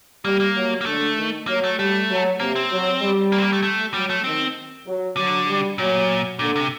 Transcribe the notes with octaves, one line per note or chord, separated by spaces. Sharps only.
G3 A#3
A#3
F#3
A#3
D3 A3
D#3
F#3 A#3
A3
G3 A3
F#3
C3 A#3
C4
F#3
G3
A#3
C4
A#3
A3
A3
F#3 G3
A3
D#3 C4
F#3
D3 F#3
G3
A#2 F#3
A#2 D3
C3